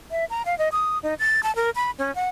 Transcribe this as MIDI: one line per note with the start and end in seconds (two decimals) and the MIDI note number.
0.11 0.25 76
0.30 0.42 82
0.46 0.57 77
0.58 0.69 75
0.72 0.98 87
1.03 1.14 63
1.19 1.41 93
1.43 1.54 81
1.56 1.70 70
1.75 1.91 83
1.98 2.14 61
2.15 2.29 78